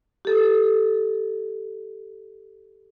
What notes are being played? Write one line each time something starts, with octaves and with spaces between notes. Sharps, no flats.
G4 A4